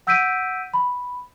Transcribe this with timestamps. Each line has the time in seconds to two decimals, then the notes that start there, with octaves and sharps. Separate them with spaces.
0.07 F#5 E6 G6 B6 D7 D#7
0.74 B5